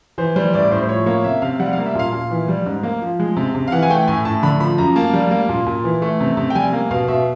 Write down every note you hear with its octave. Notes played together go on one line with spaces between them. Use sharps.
E3 C5
G3 C5
A2 D5
A2 C5
C5
F3 C#5
A#3 C#5
C3 E5
C3 F5
G3 F#5
A#3 F5
E5
A#2 F5
A#2
E3
G3
G#2
A#3
F3
G#3
C3
C3
F5
E3 F#5
G#5
A3 G5
A2 G#5
A2 A5
D3 B5
F3 B5
F#2 A#5
A#3 A5
G3
A#3
A#2
A#2
E3
A3
C3
C3
G5
G3 G#5
A#3
B2 F5
B2 E5